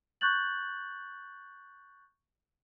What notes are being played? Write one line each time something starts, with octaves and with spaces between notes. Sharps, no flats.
C#6 F#6 G6 A6 F#7